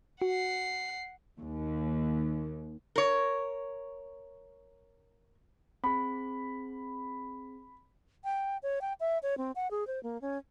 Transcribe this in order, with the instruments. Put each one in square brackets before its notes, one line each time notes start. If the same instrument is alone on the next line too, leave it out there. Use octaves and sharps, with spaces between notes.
[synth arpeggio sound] F#4 [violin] F#5 C7
[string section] D#2
[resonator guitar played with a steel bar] A#4 C#5
[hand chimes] C4 G#4 [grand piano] B5
[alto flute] G5
C#5
G5
E5
C#5
C4
F#5
G#4
C5
A#3
C#4